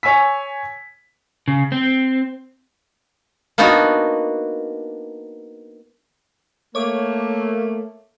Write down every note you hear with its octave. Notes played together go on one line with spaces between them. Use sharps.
C#5 G#5 E6 B6
C#3
C4
A#3 B3 D4 D#4 F#4
A3 A#3 C#5 D6